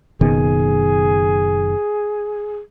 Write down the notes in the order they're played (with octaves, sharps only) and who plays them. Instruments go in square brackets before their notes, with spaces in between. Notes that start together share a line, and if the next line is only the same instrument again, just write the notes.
[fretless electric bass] F#1 B2 D#3 [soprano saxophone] G#4